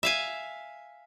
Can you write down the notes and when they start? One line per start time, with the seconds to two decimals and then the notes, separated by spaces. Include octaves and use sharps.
0.03 E5 F5 G#5